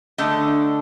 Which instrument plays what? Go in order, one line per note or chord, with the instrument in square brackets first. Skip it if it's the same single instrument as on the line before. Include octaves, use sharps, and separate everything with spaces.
[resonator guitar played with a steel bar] D3 A3 D4 D#5